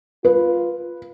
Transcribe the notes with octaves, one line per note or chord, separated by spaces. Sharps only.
F4 B4